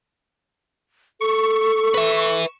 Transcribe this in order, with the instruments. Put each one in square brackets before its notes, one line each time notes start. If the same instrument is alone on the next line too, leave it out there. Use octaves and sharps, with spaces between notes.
[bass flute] A4 [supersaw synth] C#6
[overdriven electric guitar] B4 E5